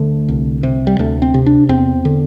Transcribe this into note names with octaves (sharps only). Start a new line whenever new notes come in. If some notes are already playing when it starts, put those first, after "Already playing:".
Already playing: D2 D3 A3
C2
C3
G3
D2 A3
C4
C3
D4
E2 C4
D3